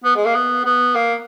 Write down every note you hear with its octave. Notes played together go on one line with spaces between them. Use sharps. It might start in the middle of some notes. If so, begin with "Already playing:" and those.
B3
G#3
A#3
B3
B3
A#3